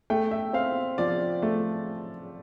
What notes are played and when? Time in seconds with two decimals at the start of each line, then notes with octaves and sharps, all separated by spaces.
0.10 A3 G5
0.31 E5
0.53 C4 F5
0.98 F3 D5
1.42 A3